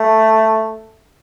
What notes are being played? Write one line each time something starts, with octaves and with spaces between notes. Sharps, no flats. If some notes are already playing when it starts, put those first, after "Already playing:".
Already playing: A3